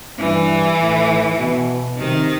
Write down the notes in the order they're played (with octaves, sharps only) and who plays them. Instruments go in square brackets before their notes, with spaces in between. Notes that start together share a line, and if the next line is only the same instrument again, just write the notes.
[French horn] G2 [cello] E3
[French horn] A2
B2
[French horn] C3 [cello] D#3